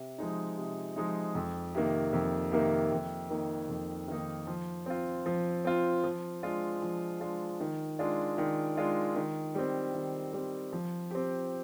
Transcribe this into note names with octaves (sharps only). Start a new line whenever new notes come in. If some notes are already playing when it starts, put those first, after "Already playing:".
Already playing: C3
F3 G#3 D#4
C3
F3 G#3 D#4
F2
C3 D#3 A#3
F2
C3 D#3 A#3
F2
D#3 A#3 D#4
F2
D#3 A#3 D#4
F3
C4 F4
F3
C4 F4
F3
G#3 D4 F4
F3
G#3 D4 F4
D#3
G#3 D4 F4
D#3
G#3 D4 F4
D#3
G3 C4
D#3
G3 C4
F3
C4 G4